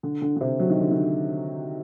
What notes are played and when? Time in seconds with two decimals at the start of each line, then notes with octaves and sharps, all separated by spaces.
0.03 D3
0.22 D3
0.36 D3
0.41 C3
0.60 F#3
0.70 D#3
0.80 D3
0.91 D#3